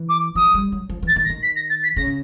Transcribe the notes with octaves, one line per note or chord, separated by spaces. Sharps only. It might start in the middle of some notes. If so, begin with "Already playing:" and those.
Already playing: E3
D6
F3 D#6
G3
F#3
F3
E3
A6
D#3
A#6
D#3
B6
A#6
A6
B6
C#3 A#6